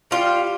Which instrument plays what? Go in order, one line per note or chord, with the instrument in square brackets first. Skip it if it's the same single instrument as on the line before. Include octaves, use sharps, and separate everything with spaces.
[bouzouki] G3 F4